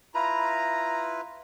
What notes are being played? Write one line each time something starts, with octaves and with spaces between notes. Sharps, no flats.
E4 F4 B4 A#5